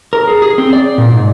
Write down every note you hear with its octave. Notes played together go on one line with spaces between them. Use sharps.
A#4
G#4
G#4
C4
D5
A#2
G#2